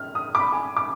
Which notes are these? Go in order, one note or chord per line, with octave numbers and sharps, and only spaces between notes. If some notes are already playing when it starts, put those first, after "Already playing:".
Already playing: F6
D#6
D6
B5
G#5
D6